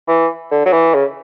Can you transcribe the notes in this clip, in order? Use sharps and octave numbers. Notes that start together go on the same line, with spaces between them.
E3
D3
F#3
E3
C#3